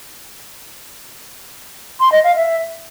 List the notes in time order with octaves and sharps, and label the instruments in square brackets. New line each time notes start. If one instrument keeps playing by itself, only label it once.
[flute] C6
D#5
F5
E5